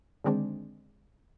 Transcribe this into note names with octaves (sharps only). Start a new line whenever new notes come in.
D3 D#3 G#3 C4 D4